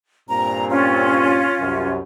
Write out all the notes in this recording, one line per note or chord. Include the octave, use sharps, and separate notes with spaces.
G2 A#2 C4 A#5
C#4 F4
C2 F#2 C3